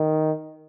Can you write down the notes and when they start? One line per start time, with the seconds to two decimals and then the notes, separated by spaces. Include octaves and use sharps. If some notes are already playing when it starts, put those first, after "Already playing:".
Already playing: D#3